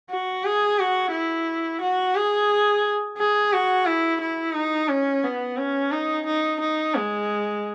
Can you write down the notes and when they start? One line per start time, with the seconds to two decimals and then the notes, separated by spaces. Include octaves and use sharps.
0.11 F#4
0.45 G#4
0.79 F#4
1.12 E4
1.82 F#4
2.16 G#4
3.18 G#4
3.53 F#4
3.86 E4
4.21 E4
4.55 D#4
4.89 C#4
5.24 B3
5.58 C#4
5.92 D#4
6.26 D#4
6.60 D#4
6.95 G#3